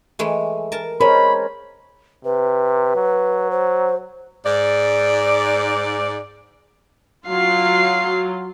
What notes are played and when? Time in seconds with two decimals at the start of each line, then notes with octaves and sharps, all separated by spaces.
0.19 E3 G#3 A3
0.72 A#4 A5
1.01 G#3 A#4 C5 C#5 B5
2.25 C3 B4
2.96 F#3
3.50 C5
4.45 G#2 D5
7.28 F#3 F4 F5 C7